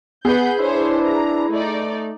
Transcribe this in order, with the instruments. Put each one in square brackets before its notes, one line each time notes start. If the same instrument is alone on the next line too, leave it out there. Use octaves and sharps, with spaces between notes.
[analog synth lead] B3 [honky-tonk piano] G#4 B4 [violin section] F#5 B5 G6
[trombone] D4 [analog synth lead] E4 [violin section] C5 C#5
[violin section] A#5
[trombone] A3 [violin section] D#4 D5